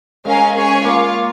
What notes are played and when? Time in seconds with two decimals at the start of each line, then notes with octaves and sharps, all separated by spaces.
0.25 G#3 C#4 A#4 F5 G#5
0.54 C#4 G#4 C#5 G#5
0.84 A#3 F4 C#5 F5